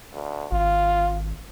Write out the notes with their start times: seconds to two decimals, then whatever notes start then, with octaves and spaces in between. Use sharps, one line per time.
0.13 D2
0.51 G#1 F4